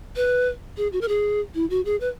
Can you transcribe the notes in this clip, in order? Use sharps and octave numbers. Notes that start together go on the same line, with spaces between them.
B4
G#4
F#4
A#4
G#4
E4
F#4
G#4
B4